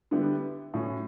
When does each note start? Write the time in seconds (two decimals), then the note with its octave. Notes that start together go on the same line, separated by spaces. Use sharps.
0.11 D3 G3 B3 E4 G4
0.74 A2 F#3 C#4